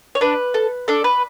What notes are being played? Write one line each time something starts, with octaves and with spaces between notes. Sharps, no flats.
C#5
D4 B4
A4
D4 A4
B4